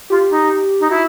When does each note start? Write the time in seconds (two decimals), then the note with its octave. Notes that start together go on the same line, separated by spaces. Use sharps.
0.10 F4 G4
0.30 D#4
0.80 D#4
0.90 E4 F#4